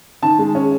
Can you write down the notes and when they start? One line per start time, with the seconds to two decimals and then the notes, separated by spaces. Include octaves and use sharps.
0.23 D#3 A5
0.39 G#3
0.55 C#4